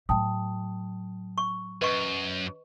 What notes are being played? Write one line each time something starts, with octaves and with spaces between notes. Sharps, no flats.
A2 F#3 G5 A5 D#6
C#6
F#2 B4 D#5 C#6